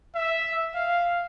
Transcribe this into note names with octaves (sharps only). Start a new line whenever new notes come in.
E5
F5